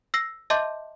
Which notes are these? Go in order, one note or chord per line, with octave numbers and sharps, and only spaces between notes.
E6 A#6 C7
D#5 E5 A5 C6 D6 G6